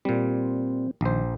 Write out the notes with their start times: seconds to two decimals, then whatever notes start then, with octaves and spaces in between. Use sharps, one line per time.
0.05 A#2 G3 C4
1.01 A#1 D#3 C5